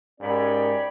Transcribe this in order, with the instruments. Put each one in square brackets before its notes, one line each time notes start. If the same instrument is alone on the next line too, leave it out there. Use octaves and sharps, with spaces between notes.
[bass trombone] G#2 [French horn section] C#4 G4 A#4 [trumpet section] C#5 G5 B5 [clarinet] D5